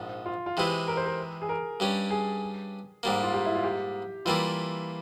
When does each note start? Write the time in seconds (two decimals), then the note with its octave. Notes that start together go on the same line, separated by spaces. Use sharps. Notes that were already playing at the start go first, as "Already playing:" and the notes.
Already playing: A#1 G#2 F3
0.26 F4
0.46 F4
0.57 C3 E3 G#3 E4 G4
0.88 A#4
0.97 C5
1.06 A#4
1.42 G#4
1.49 A#4
1.80 G2 G3 C#4
2.10 G#4
3.03 G#2 G3 A#3
3.23 F4
3.34 G4
3.45 E4
3.55 F4
3.64 G4
4.25 E3 G3 A#3 E4 F4